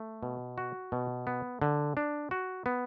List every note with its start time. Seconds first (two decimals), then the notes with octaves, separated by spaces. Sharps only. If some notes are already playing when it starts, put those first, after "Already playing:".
Already playing: A3
0.23 B2
0.58 F#4
0.92 B2
1.27 B3
1.62 D3
1.97 D4
2.31 F#4
2.66 B3